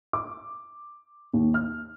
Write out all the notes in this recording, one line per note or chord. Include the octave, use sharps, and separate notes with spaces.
D6
D#2
F6